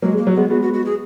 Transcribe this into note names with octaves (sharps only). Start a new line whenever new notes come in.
F#3 G#3 A#3
G#3
A#3
F#3
G#3 B3
G#3 B3 F#4
F#4
F#4
G#4